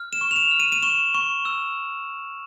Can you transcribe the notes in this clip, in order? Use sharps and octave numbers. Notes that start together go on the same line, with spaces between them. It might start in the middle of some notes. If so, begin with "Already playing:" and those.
Already playing: F6
E7
C#6
F7
E7
F6
D#7
D#7
C#6 E7
C#6
E6